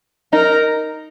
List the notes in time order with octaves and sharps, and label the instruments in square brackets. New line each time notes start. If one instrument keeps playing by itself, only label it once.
[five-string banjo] D#4 [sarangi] A#4